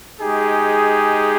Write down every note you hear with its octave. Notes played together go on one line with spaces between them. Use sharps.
G#3 D#4 G4 G#4